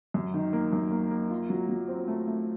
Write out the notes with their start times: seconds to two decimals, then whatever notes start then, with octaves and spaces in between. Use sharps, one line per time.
0.14 F#2
0.34 D#3
0.53 A#3
0.72 F#2
0.92 A#3
1.11 A#3
1.30 F4
1.50 F#3
1.69 F#3
1.88 C4
2.08 A3
2.27 A3